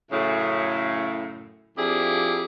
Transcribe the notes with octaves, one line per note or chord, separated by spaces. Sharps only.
F#2 A2 C#3
F2 F3 D4 E4 G4 G#4